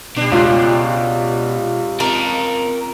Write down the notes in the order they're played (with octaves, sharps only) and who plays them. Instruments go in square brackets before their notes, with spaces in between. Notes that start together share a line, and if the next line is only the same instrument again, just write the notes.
[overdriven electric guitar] B2 [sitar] G3 D4
[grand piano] C#2 F4 [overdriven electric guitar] B2
[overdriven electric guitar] C4 A5 [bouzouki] A#4